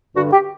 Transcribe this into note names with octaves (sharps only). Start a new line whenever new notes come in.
G2 D3 F#4
G4